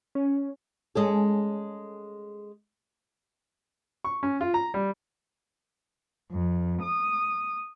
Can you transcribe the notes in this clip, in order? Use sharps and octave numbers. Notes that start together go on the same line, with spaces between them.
C#4
G#3 C#4 A4
C#6
C#4
F4
A#5
G3
F2
D#6